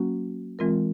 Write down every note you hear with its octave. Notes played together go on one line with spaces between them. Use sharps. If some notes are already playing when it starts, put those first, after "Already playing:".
Already playing: F#3 A#3 C#4 F#4
E3 G#3 C4 F4 A#4